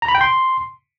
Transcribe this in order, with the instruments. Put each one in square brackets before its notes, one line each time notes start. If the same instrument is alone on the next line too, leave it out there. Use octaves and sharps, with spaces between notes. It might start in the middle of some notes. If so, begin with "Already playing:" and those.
[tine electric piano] A#5
B5
G5
C6